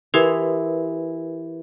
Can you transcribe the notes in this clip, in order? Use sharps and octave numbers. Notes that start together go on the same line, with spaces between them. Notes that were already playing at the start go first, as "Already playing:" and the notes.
E3 G4 A#4 B4